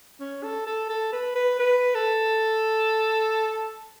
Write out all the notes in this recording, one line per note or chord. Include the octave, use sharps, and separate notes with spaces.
C#4
A4
A4
A4
B4
B4
B4
A4